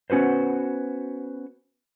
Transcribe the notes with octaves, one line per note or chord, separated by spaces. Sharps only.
B3 C#4 F#4 B4 C5